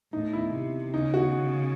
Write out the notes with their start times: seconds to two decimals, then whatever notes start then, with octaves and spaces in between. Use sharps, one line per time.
0.13 A2 D#4
0.33 E4
0.52 C3
0.94 C#3 D#4
1.14 F#4